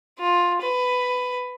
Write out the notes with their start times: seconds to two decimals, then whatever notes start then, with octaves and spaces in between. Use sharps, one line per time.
0.19 F4
0.61 B4